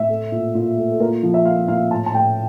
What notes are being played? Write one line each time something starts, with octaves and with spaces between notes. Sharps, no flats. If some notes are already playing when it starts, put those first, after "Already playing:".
Already playing: A2 E5
A3
A#2
A#2
A3
A4
A#2 A#4
F3
E5
A#3 F5
A#2 F5
A2 A5
A5
A2 G5